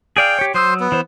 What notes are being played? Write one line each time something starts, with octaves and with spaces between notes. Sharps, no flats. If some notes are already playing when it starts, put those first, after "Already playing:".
G#4 D5 F5 G5
G4 C#5
F#3 C5 C6 D#6 E6
B3
E3 C5